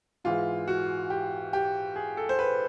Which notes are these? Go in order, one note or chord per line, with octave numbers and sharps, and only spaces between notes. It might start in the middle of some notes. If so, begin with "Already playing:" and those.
G#2 E3 G#3 F4
F#4
G4
G4
G#4
A4
C5
B4